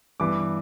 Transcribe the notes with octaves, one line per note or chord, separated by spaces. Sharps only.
G2 E3 B3 D6